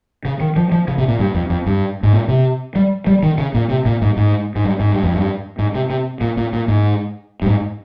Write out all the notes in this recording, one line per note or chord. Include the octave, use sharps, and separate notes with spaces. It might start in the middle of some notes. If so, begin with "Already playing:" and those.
C#3
D#3
F3
F3
C#3
C3
A#2
G2
F2
F2
G2
G#2
A#2
C3
G3
G3
D#3
C#3
A#2
C3
A#2
G#2
G#2
G#2
G2
G#2
G2
F2
G2
G#2
C3
C3
A#2
A#2
A#2
G#2
G2
G#2